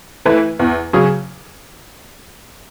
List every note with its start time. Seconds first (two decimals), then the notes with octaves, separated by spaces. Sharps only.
0.25 E3 A3 E4 B4
0.59 E2
0.93 C#3 F#3 C#4 G#4